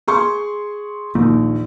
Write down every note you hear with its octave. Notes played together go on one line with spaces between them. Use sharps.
G#4 C6 C#6
A#1 D#2